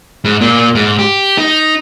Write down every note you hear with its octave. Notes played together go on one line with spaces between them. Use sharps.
G#2
A#2
G#2
G4
D#4